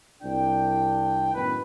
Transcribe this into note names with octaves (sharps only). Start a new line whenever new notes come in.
C2 D4 G5
F#2 A2 D#3 B3 B4